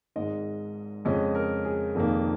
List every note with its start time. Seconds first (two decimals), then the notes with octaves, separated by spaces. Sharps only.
0.16 G#1 G#2 G#3 D#5
1.05 F2 C#3 G#3 C#4 D#5
1.35 A#4
1.65 G#4
1.95 F1 F2 D#3 A#3